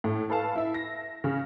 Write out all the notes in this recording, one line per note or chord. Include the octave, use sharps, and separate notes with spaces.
A2
A4 B4 F5 A5
E4 E5
A#6
C#3